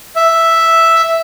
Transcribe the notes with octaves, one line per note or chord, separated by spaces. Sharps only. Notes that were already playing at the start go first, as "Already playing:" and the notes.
E5